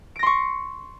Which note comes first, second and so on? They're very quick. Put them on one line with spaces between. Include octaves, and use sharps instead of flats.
D7 A#6 C6 C#6